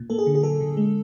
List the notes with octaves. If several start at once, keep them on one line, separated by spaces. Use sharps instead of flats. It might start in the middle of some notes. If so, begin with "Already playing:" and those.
Already playing: A#2
A#3 A4
G#4
D3
G#4
F#3 A4
D3
G#3